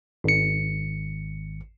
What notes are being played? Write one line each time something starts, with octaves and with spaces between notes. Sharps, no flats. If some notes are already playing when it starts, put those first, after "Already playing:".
G#1 C#7